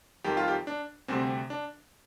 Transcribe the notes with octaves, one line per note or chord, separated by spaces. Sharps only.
F2 D#3 G3 G4
F4
G4
D4
D2 C3 G3 C4
D4